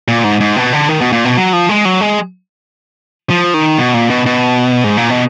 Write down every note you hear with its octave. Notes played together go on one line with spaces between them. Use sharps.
A#2
G#2
G#2
B2
D3
D#3
B2
A#2
B2
F#3
F3
G#3
F#3
G#3
F3
D#3
B2
A#2
B2
B2
G#2
A#2
B2